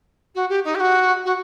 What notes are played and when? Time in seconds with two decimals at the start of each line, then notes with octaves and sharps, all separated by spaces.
0.34 F#4
0.49 G4
0.64 D#4
0.74 G4
0.80 F#4
1.25 F#4